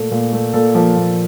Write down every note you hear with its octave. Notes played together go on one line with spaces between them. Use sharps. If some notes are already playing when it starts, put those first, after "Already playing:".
Already playing: A#2 A3
A#2
A3
A#2 A4
F3 A#3
A#2